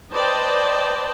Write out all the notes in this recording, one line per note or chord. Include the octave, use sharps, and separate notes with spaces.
B4 C5 D5 D#5 G5 A5